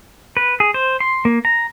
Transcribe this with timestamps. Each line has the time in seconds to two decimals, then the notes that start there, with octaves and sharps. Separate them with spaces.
0.37 B4
0.60 G#4
0.74 C5
1.00 C6
1.25 A#3
1.45 A#5